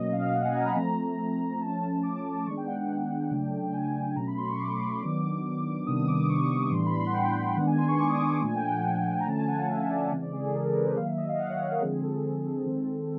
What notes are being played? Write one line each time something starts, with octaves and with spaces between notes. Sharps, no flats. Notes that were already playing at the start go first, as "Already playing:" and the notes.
Already playing: B2 F#3 A#3 C#4 D#5
F5
F#5
G#5
A#5
B5
F3 A3 C4 A#5
F3 A3 C#4 A5
D6
D#3 G#3 B3 D4 C#6
G5
F#5
G5
C#3 F#3 A3 D4
G5
G#5
B2 F#3 A3 C#4 A#5
B5
C6
C#6
D6
D#3 F#3 B3 D4
C3 D#3 G3 B3 D4 D#6
D6
C#6
A2 E3 G3 B3 D4 C6
B5
C6
F#5
G5
D#3 G#3 B3 D4 F#5
G#5
C6
C#6
D6
D#6
D6
C#6
A#2 F3 A3 D4 G#5
G5
F#5
A#5
D3 F3 A3 C#4 A5
G#5
F#5
F5
E5
D5
C#3 E3 G#3 C4
D5
G#4
A4
A#4
A4
A#4
B4
C5
D#3 F#3 A#3 F5
E5
D#5
F5
F#5
C#5
A#4
D3 F3 G#3 C4 G#4
A4
D#3 G#3 C4